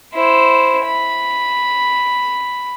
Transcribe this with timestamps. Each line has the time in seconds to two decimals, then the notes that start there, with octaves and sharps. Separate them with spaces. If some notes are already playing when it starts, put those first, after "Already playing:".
0.15 E4 C5
0.86 B5